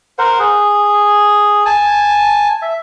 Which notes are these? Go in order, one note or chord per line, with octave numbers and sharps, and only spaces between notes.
A#4 C5 F#5
G#4
G#5 A5
E5